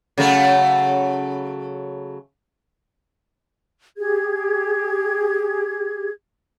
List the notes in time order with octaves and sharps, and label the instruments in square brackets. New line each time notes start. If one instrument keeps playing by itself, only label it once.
[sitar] C#3 F#3 A3
[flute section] G4 G#4 G#6